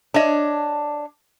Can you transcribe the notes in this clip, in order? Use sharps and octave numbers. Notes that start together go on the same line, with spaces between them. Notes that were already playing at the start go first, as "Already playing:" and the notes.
D4 C#5 D#5